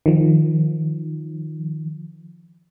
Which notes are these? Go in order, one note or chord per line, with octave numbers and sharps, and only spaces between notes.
D#3 F3